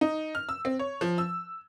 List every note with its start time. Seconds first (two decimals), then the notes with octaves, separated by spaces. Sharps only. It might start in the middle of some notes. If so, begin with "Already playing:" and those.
0.01 D#4
0.35 F6
0.49 E6
0.65 C4
0.79 C#5
1.01 F3
1.18 E6